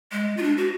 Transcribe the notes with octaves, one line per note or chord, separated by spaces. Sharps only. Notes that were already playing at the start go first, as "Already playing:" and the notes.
G#3
F4
D4
F#4